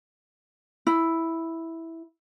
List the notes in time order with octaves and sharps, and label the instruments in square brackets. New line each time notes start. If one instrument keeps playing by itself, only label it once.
[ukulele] E4